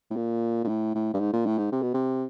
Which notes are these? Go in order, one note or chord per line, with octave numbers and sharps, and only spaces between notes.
A2
A#2
A#2
A2
A2
G2
G#2
A#2
A2
G#2
C3
B2
C3